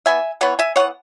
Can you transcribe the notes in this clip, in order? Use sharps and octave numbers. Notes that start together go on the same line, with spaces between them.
E3 B3 E5 G#5
E3 B3 C#5 F#5
E5 G#5
E3 B3 C#5 F#5